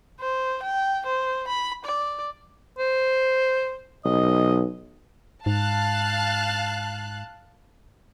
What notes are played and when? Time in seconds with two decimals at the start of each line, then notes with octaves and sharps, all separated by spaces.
0.20 C5
0.63 G5
1.06 C5
1.48 B5
1.85 D5
2.79 C5
4.05 B1 D#5
5.46 G#2 F5 A5 F#6